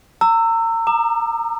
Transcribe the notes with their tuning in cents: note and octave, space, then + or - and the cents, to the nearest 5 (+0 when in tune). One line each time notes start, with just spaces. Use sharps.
A#5 -35 E6 +5
A#5 +0 D6 +45